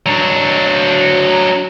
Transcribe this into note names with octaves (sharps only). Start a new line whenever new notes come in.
F#3 D4